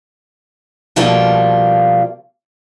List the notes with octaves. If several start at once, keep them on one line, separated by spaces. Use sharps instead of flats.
B2 F3 G3 A3 A#3 F4